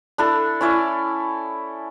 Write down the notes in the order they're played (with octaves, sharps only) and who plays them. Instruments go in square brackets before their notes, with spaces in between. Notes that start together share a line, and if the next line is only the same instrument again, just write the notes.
[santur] D4 E4 A4
C#4 E4 D5